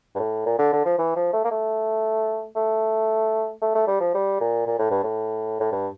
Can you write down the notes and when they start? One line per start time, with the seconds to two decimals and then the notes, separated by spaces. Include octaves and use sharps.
0.15 G2
0.20 A2
0.46 A#2
0.59 D3
0.73 D3
0.85 F3
0.98 E3
1.16 F3
1.33 A3
1.45 A#3
1.51 A3
2.56 A3
3.62 A3
3.75 A3
3.87 G3
4.01 F3
4.15 G3
4.41 A#2
4.67 A#2
4.79 A2
4.91 G2
5.03 A2
5.60 A2
5.72 G2